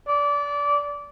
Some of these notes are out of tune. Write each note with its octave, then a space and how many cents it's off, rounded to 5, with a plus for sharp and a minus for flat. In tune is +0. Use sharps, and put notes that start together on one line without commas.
D5 -20